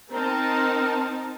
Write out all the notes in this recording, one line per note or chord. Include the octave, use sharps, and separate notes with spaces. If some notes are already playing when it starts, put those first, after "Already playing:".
C4 D#4 A#4 A5